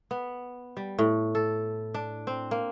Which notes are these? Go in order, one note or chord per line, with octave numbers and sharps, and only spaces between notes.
B3
G3
A2
A4
D4
C4
A#3